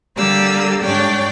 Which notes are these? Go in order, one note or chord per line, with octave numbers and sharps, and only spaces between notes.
D3 G3 A#3 G4 D5 E6
G#2 D4 C#5 D5 G5